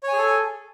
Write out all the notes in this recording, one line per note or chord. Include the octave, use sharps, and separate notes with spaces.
G#4 A4 C#5 G#5